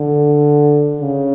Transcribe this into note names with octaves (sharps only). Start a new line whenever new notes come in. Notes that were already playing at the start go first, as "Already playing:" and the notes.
Already playing: D3
C#3